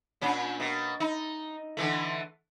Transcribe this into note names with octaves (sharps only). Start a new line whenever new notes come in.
A#2 C#4 D4
B2 A#3
D#4
D3 E3 A3